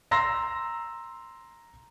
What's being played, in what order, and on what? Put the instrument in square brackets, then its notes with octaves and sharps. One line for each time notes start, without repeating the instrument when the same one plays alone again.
[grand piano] A#5 C6 E6 A#6